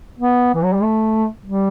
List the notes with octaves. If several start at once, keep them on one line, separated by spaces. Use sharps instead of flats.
B3
E3
F#3
G3
A3
G3